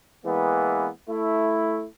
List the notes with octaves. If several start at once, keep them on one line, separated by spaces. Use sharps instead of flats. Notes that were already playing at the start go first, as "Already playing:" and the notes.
E3 G#3 A#3 B3
A3 E4